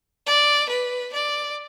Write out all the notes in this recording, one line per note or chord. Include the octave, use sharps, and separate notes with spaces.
D5
B4
D5